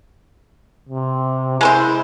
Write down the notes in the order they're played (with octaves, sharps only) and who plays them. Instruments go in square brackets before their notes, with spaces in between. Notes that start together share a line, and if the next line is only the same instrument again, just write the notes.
[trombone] C3
[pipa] G#3 A#4 C5 [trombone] E4